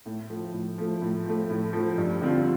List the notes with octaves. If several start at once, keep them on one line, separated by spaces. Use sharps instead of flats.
A2
F3 A3
A2
F3 A3
A2
F3 A3
A2
F3 A3
G2
D3 F3 C4 F4